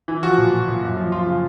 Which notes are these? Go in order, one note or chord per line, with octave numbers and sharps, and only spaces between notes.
E3
F3 F#4
A#2
A#2
A#2
F#2
F3
F3 F4
C#3